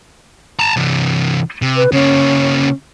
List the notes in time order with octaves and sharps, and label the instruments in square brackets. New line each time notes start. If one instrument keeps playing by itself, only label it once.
[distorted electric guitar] A5 A#5
C3 E3
C3
[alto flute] B4
[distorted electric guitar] C#3 A#3 [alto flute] C#4